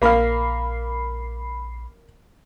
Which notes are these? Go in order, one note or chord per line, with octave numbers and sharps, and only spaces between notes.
A#1 A#3 F5 B5 C7